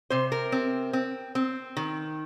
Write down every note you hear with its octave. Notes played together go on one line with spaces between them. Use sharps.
C3 C5
A#4
C4
C4
C4
D#3